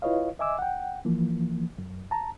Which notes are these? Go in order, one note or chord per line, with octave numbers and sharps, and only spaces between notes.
E4 F4 B4 C#5 D#5 F5
D#5 E5 G#5 D6 E6
F#5 G5
E3 F3 A#3
F#2
A5 A#5